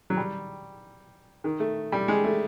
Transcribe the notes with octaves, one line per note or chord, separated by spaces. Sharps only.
F#3
G3
D#3
A3
G3
G#3
A3